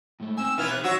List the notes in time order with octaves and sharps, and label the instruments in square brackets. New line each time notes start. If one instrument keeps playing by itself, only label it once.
[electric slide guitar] A2 G#3 A3
[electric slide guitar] C4 G#5 [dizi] E6
[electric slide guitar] B2 D#4 [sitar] E3 B3 E4 [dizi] F6
[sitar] C3 [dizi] F#6
[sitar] F#3 F#4 [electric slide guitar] C#5 [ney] F#5 [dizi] E6